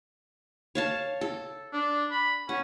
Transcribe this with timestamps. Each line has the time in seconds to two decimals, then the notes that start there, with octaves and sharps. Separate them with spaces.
0.75 C#5 F5 A5
1.21 A4
1.73 D4
2.11 B5
2.49 C#4 F#5